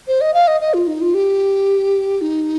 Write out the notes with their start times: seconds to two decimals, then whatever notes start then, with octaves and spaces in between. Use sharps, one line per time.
0.08 C5
0.21 D#5
0.34 F5
0.48 D#5
0.61 D#5
0.74 F4
0.87 D#4
1.01 F4
1.14 G4
2.21 D#4